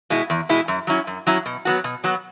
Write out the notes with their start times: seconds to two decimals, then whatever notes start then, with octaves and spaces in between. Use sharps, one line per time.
0.10 B2 G#3 E4
0.30 E2
0.49 B2 G#3 E4
0.68 F#2
0.87 F#3 C#4 E4
1.07 F#2
1.27 F#3 C#4 E4
1.46 B2
1.65 F#3 B3 F#4
1.84 B2
2.04 F#3 B3 F#4